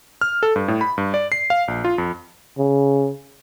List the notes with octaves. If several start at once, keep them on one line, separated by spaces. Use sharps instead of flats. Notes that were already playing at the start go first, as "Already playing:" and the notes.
F6
A4
G2
A2
B5
G2
D5
C7
F5
A#1
F4
F2
C#3